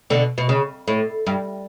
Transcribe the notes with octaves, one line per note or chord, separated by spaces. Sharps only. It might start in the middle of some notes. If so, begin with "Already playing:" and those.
B2 D3
B2
C#3
A2
G2